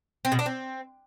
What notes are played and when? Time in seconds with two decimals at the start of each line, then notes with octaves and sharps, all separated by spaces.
0.25 C4
0.32 B2
0.39 D4
0.46 C4